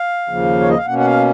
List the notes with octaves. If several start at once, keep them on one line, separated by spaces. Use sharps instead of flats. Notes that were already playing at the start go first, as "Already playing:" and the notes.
Already playing: F5
D#2 C#3 F3 A#3
C#5
D#5
F5
B2 A#3 C#4 F#5
F#5
F5